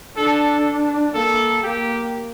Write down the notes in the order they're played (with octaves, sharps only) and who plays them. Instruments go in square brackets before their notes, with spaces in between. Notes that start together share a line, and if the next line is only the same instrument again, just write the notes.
[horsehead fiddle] D4 [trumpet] A4
[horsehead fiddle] A#3 [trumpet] A4
[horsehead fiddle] A#3 [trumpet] G4